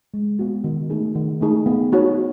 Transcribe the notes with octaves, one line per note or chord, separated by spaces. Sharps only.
G#3
B3 F#4
D#3
A3 D#4 G#4
D#3
A3 D#4 G#4
B3
D#4 F#4 C#5